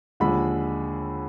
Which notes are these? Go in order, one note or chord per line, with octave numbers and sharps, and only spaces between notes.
D#2 D3 F3 G#3 B5